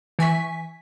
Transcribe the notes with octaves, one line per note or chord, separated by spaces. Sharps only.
E3 G#5 C#6 B6